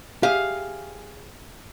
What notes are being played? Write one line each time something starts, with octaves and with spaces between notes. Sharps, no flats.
G4 G#4 E5 F5